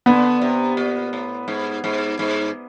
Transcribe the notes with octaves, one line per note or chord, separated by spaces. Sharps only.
D3 B3
C3
A#2
A2
G#2
G#2
G#2